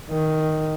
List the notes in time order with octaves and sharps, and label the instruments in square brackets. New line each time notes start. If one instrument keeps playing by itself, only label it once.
[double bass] D#3